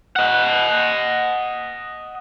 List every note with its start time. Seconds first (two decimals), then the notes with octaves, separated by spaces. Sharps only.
0.16 D#5 F#5